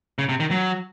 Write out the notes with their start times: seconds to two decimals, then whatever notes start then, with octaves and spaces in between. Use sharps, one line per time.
0.19 C#3
0.29 C3
0.40 D#3
0.51 F#3